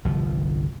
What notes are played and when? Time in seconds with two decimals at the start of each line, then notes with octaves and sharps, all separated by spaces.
0.05 G1 C2 F3